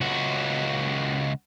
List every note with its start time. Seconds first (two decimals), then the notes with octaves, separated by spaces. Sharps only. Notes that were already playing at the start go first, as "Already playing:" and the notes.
0.01 C#2 F#4